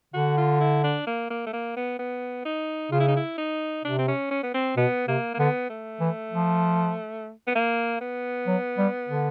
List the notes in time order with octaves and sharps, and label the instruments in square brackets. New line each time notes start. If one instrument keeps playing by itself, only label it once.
[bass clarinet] D3 [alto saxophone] F#4
[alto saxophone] F4
E4
D4
A#3
A#3
A3
A#3
B3
B3
D#4
[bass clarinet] C#3 [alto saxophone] F4
[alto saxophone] E4
D#4
E4
D#4
[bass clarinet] C3 [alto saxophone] D4
[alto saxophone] C4
C#4
C#4
B3
C4
[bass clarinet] B2 [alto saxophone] B3
[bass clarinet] C3 [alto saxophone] A#3
[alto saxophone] A#3
[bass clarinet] D3 [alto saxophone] B3
[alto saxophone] A3
[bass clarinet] E3
F3
[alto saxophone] B3
A#3
B3
[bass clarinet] F#3
G3
D3